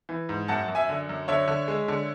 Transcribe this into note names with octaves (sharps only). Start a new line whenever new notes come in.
E3
G#2
F#2 F#5 A5
F#2
E5 G#5
D3
F#2
D3 C#5 E5
D3
G#3
D3